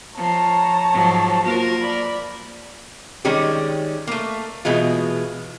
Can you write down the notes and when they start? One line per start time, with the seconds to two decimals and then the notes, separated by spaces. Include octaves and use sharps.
0.17 F3 C#5 A5 A#5
0.92 G#2 F3 F#3
1.43 F3 A#3 F#4 A#4
1.82 D5 B5
3.25 D#3 G3 G#3 C#4 G4
4.07 A3 A#3
4.65 B2 E3 G#3 F4